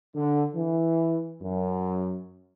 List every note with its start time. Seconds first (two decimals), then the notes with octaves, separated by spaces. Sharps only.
0.15 D3
0.55 E3
1.42 F#2